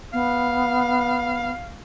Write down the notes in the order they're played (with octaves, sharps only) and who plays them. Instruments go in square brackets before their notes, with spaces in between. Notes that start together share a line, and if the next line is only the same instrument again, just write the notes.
[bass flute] B3 [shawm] F5